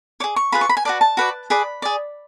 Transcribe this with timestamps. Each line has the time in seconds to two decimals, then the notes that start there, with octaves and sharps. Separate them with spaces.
0.20 G#4 C#5 D6
0.36 C#6
0.52 F4 G#4 B4 B5
0.61 C#6
0.69 B5
0.77 G#5
0.85 F#4 B4 D5 A5
1.01 A5
1.17 F#4 B4 D5
1.50 G#4 B4 D5 B5
1.82 G#4 D5